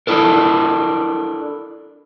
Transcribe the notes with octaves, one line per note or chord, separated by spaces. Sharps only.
D4 E4 A4 A#4